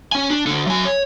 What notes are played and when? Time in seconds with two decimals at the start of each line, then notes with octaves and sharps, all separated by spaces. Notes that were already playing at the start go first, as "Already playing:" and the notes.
0.12 C#4 G#5
0.31 D4
0.47 D2 D3
0.67 F#3 G#5
0.85 C#5